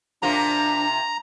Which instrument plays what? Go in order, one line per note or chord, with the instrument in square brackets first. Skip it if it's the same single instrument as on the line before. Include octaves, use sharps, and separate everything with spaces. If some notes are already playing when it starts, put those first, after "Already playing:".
[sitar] C3 A#3 F4 [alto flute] D4 [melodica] A#5